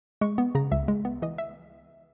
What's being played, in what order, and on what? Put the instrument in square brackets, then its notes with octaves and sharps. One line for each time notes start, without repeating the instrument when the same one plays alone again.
[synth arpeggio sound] G#3 C#6
B3
C#3 A#5
C#2 E5
G#3
B3
E3 D#5
E5